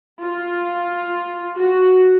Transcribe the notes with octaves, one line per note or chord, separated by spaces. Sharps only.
F4
F#4